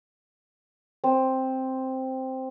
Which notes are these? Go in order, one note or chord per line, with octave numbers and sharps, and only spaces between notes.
C4